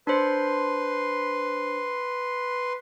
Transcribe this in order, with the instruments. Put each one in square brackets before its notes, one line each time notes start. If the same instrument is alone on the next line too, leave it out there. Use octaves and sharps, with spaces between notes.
[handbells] D4 C5 [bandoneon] B4 C6